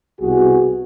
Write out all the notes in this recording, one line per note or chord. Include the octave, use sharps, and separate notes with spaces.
C2 B2 F#4 G#4